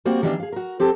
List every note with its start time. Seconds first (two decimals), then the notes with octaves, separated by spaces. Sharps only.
0.05 G3 A#3 C4 F#4
0.22 D#3 E3 G3 B3 C#4 D4
0.40 G#4 F5
0.52 F#4 A#4
0.80 C4 G4 A4